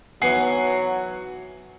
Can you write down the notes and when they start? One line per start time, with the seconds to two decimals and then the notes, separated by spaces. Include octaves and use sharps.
0.22 E3 F#3 B3 D#4 F#5 G#5 C7